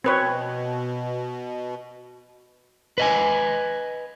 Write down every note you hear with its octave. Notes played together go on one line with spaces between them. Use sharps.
B2 C4 B4 C#5
B4 D#5 G#5